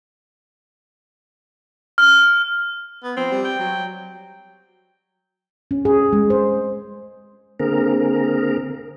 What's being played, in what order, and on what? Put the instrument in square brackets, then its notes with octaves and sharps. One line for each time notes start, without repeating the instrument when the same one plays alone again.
[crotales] F6
[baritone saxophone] B3
[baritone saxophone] F3 [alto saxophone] C4
[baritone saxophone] G3
[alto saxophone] G5
[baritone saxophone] F#3
[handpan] C#4
G#4
G#3
C5
[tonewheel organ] D3 A#3 C4 G#4 A#4 A#5